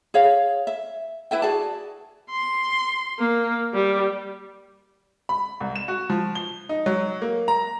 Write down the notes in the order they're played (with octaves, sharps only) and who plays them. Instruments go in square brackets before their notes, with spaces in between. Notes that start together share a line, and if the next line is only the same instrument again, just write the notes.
[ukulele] G#4 C#5 F5
E5
E4 B4 E5 G5
F#4 G#4 D5 A5
[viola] C6
A#3
G3
[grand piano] B5
C2
E7
F#4
F3
G7
D#4
F#3
A#3
A#5